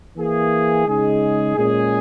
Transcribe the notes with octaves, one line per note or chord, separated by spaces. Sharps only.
E3 A#3 E4 G#4
C#3 G#3 D#4 G#4
A#2 G#3 C#4 G#4